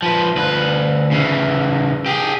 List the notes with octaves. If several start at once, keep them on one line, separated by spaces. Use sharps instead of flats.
F3 B4
D2 B4
C#3 E3
G4 G#4